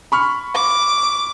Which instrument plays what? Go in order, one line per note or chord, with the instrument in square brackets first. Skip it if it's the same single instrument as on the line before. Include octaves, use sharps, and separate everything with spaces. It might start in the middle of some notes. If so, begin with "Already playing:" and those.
[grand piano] B5 C#6 F6
[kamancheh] D6